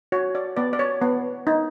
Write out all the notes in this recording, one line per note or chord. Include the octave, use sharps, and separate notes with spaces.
F#4 C#5
D5
B3 D5
D5
C#5
B3
D#4